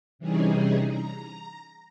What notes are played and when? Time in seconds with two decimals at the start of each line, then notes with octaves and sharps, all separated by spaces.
0.19 C3 E3 G3 C#4 D#4 G#4
0.85 A#5